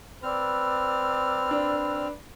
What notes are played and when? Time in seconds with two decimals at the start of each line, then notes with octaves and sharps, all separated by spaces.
0.23 C4 B4 D5 E6 F6
1.51 D4